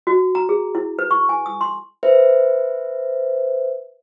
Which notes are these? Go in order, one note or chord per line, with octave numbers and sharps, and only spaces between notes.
F#4
A#5
G#4
E4
B4
C#6
G#5
D#6
C6
B4 C5 E5